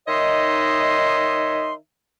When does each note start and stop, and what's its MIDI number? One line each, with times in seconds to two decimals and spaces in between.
0.08 1.74 51
0.08 1.74 63
0.08 1.74 73
0.08 1.74 75
0.08 1.74 76
0.08 1.74 84